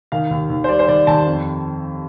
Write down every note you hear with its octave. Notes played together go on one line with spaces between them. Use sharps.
D#3 F5
D#2
D#2
C5
G3 D5
C5
D#3 D5
D#2 A5
F2